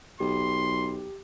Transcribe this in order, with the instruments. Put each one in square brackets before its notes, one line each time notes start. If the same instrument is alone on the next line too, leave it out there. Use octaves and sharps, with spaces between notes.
[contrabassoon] B1 [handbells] G4 [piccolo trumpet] C6